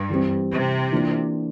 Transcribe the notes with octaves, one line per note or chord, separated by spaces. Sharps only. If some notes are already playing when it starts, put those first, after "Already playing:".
Already playing: G2
E3 G3 C4
C3
E3 A#3 D4 F4